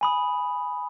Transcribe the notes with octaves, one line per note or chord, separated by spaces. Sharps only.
G#5 B5 D#6